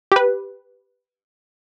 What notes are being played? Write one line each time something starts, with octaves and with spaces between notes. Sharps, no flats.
G4 B4